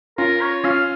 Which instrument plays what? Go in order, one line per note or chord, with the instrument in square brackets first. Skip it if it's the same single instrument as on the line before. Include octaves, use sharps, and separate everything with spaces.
[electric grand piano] C#4 F4 [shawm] A#4
[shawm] C#5
[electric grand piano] C#4 F4 [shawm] F5